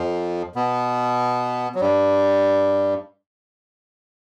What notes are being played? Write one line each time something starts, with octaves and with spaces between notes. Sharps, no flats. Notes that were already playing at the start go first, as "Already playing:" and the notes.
Already playing: F2 F3
B2 B3
F#3
G2 G3